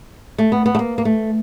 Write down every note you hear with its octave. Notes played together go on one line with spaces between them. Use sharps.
A3
B3
B3
A3
A#3
A#3
A3